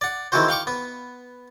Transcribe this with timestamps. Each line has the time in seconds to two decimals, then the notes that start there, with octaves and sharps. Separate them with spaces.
0.01 D5 F#5
0.32 D#3 E3 G#3 C4 F#4 C5
0.49 F5 G5 C#6 D6
0.67 B3